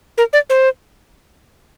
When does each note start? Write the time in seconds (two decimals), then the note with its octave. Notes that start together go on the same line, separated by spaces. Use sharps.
0.18 A#4
0.33 D5
0.50 C5